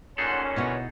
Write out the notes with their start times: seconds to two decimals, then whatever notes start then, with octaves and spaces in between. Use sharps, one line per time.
0.18 A#2 C#4 D#4 G#4 A4 F#5 C6
0.56 B2 D3 E4 F#4 B4 C#5